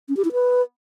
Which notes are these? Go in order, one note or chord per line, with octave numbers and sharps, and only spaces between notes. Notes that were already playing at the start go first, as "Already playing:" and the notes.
C#4
G4
E4
B4